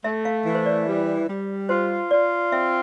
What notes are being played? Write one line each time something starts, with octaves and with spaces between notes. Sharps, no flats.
A3 E5
F5
E3
C5
D5
G3
G3
F4 C5
F4 D5
C4 E5